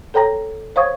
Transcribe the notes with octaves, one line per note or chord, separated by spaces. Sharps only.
A4 C#5 G5 A#5 A#6
C5 C#5 F5 C#6 D#6 G#6